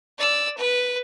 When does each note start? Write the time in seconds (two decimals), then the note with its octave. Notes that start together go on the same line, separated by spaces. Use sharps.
0.18 D5 E6
0.57 B4